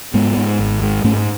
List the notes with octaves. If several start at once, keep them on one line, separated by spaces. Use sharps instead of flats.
G#2 G#3 B3
G#2
G#1
G#2
G#2 A3 C#4